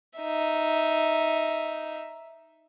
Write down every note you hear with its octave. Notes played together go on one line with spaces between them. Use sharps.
D#4 E5